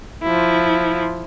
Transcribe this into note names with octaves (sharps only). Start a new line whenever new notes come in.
F3 E4